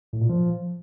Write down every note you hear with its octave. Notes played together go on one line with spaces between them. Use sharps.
A2
A#2
F3